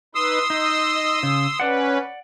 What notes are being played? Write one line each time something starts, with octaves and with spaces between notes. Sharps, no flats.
D#4 B4 C6 D#6 E6
D#4 D#5
C#3
C#4 B4 D5 F#5